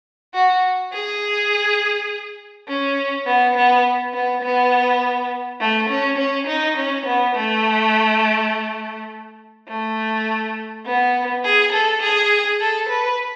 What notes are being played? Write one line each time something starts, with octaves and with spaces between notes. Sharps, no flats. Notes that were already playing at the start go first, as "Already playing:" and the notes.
F#4
G#4
C#4
B3
B3
B3
B3
A3
C#4
C#4
D#4
C#4
B3
A3
A3
B3
G#4
A4
G#4
A4
B4